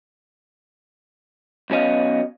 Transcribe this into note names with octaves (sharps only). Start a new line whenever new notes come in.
B1 B2 C#4 D#5 F5